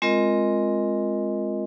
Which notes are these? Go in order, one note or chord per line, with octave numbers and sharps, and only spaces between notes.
G#3 C4 F4 A#4 D#5